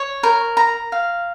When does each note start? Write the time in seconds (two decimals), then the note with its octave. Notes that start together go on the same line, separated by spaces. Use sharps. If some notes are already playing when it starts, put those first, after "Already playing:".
Already playing: C#5
0.23 A#4
0.57 A#5
0.92 F5